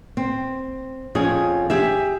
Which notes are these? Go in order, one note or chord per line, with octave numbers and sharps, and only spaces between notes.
C4
F2 C#4 G#4
G4 G#4 E5